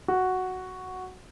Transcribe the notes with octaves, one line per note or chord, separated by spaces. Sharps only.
F#4